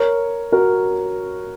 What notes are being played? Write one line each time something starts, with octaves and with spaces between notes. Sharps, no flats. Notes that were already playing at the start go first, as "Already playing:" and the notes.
Already playing: A#4 C#5
F#4 A#4